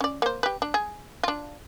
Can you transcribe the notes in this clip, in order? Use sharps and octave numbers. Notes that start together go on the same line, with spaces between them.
C#4 D5
A#3 C5
G4 B4
D4
G#4
D4 F4